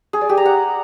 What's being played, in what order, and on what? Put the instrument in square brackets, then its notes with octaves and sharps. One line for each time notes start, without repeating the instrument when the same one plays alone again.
[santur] G#4
D5
G4
A#5
F#5